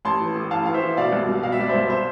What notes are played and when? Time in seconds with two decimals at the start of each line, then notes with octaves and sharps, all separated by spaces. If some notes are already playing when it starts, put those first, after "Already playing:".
0.05 A1 A5 C6
0.21 E3
0.35 A2
0.51 A1 F5 A5
0.66 E3 F5
0.74 C5 E5
0.82 E3
0.97 B2 D5 F5
1.12 C2
1.29 C2
1.43 B2 F5
1.52 E5
1.60 C2 D5
1.69 C5 E5
1.75 C2
1.90 C5 E5